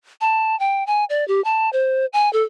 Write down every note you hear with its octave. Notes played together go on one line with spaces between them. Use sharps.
A5
G5
G#5
D5
G4
A5
C5
G#5
A4